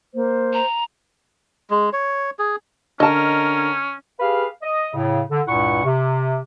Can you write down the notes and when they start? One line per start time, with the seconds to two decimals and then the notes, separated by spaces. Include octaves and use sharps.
0.14 A#3 C5
0.53 A#5
1.70 G#3
1.93 C#5
2.39 G#4
3.00 D3 C#4 A#4 D#5 A5
4.20 G4 G#4 B4 F5
4.62 D#5
4.94 A2 C#3
5.30 D3
5.47 C#2 G2 A#2 E4 F#5 C#6
5.84 C3